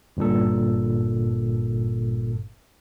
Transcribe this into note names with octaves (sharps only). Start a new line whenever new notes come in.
G1 G2 A#2 A4